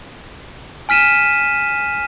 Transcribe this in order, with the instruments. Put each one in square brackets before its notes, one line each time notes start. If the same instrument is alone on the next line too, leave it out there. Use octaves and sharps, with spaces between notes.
[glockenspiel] G#5 F6 B6 D#7 E7